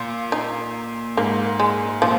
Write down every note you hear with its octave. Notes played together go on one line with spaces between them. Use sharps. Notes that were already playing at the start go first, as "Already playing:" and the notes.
Already playing: A#2 F4
D#4
G#2 A#3
G#3
A#2 F3